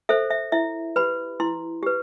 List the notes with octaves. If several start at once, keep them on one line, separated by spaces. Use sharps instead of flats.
A4 C5 E5
E5
E4 E5
G4 B4 B5
E4 C6
G4 B4